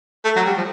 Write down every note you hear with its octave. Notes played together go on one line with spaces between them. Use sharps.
A3
F#3
G3
F3